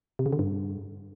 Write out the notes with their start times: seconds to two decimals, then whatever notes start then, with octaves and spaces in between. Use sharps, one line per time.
0.19 C3
0.26 C#3
0.33 D3
0.39 G2